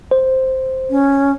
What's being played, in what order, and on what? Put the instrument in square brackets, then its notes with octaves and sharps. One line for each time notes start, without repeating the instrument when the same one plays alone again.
[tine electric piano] C5
[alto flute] C#4